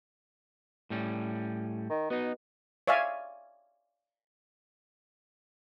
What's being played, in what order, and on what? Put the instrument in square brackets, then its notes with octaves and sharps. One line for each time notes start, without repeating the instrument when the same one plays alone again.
[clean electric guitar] A2 G3 C#4
[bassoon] D#3
[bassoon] B2 [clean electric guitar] B3 D#4
[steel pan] C#5 D5 E5 F5 G#5